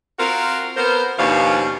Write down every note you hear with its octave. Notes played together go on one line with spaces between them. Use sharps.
C4 F4 F#4 A#4
B3 A#4 C5
D#2 B2 F3 C#4 D4 F5